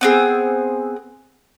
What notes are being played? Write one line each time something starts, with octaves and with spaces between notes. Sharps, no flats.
B3 C4 G#4